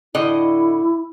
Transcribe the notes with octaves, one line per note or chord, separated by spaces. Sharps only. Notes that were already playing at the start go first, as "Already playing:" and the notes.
A2 D3 E4 D#5